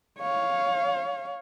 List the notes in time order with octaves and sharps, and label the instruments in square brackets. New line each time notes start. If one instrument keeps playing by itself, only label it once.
[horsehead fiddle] C#5 F5